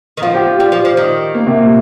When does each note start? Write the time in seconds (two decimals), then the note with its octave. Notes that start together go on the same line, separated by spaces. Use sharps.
0.17 D#3
0.22 F3 F4
0.35 G4
0.47 F4
0.59 G3 G4
0.72 F3
0.85 F3
0.97 D#3
1.35 A#3
1.47 C3
1.59 A#2